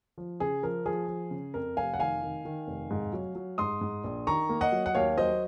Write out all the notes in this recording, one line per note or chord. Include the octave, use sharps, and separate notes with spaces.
F3
C#3 G#4
F3 A#4
F3 G#4
F3
C#3
F2 A#4
F1 F5 G#5
F#5
D#3 F5 G#5
D#3
D#3
F1
G#2
F#3
F#3
G#2 C6 D#6
G#2
A#1
D#3 A#5 C#6
A#3
D#5 F#5
F#3
F#5
D#2 C#5 F5
F#3 C5 D#5